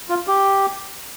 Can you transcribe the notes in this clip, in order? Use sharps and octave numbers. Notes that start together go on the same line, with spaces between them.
F4
G4